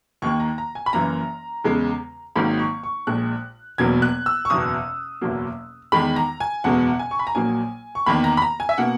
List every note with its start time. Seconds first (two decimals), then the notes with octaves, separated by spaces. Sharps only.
0.22 D#2 D#3 A#3 C#6
0.40 A#5
0.58 A#5
0.75 G#5
0.86 B5
0.93 F#1 F#2 E3 A#3 A#5
1.64 E2 C#3 G#3
2.36 G#1 G#2 D#3 F#3 A#3 B5
2.59 C#6
2.83 C#6
3.07 A#1 A#2 G#3 F#6
3.78 E1 E2 B2 F#3 A#3 G#6
4.02 F#6
4.26 E6
4.45 C#6
4.50 F#1 E2 B2 D#6
5.21 F#1 E2 B2 F#3 A#3
5.92 E2 D#3 G#3 B5
6.16 A#5
6.40 G#5
6.64 F#1 E2 B2 G#3 F#5
6.99 G#5
7.11 C#6
7.19 B5
7.27 A#5
7.35 A#1 A#2 F#3 A#3 G#5
7.95 C#6
8.06 E2 D#3 A#3 B5
8.24 A#5
8.37 B5
8.42 A#5
8.60 G#5
8.69 E5
8.78 B2 A#3 F#5